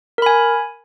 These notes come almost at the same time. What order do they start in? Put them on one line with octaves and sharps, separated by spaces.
A#4 B5 G#5